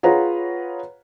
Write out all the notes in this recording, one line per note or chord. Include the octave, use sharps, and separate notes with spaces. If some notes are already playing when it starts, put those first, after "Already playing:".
F4 G#4 B4 C#5 F#5 A#5